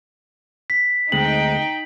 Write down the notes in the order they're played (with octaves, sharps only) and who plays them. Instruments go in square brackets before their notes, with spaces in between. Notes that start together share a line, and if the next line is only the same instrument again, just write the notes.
[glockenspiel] B6
[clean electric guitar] D2 G#3 C4 [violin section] D#4 G5 [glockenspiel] F#7